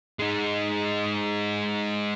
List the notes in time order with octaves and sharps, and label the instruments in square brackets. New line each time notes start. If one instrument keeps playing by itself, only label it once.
[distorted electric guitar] G#3 D#4